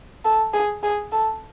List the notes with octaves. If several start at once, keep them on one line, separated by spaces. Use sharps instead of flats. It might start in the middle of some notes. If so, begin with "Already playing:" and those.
A4
G#4
G#4
A4